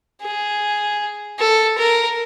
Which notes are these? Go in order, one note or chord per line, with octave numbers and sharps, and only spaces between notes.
G#4
A4
A#4